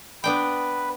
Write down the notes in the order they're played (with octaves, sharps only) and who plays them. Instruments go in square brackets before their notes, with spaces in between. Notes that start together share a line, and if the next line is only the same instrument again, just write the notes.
[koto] B3 D4 G5 [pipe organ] B4